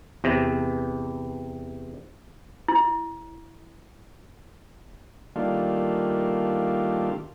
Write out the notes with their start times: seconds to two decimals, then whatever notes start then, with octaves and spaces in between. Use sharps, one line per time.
0.24 E2 C3
2.68 E4
5.36 D#3 G3 A3 A#3 D4 F4